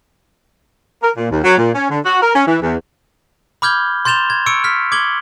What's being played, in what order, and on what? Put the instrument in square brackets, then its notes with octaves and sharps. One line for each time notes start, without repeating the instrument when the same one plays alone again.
[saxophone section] A#4
A#2
D#2
F#3
A#2
C#4
D3
F#4
A#4
C#4
E3
E2
[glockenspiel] B5 D6 F6 G6 G#6 G7
C6 G6 A6 E7 F7 G7
G#6
C#6 E6 C#7 D7
F6 B6
D6 G#6 F#7 G7